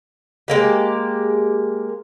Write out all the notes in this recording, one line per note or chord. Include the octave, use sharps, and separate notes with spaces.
G#3 A#3 G4